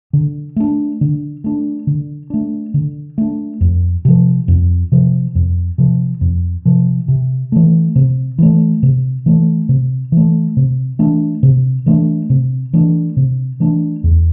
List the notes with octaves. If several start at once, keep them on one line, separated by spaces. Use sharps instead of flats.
D3
A3 D4
D3
A3 D4
D3
A3 D4
D3
A3 D4
F2
C3 F3
F2
C3 F3
F2
C3 F3
F2
C3 F3
C3
E3 A3
C3
E3 A3
C3
E3 A3
C3
E3 A3
C3
E3 A3 D4
C3
E3 A3 D4
C3
E3 A3 D4
C3
E3 A3 D4
E2